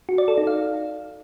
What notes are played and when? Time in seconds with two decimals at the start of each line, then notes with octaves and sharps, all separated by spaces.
0.09 F#4
0.18 D5
0.28 A4
0.38 D#4
0.47 F5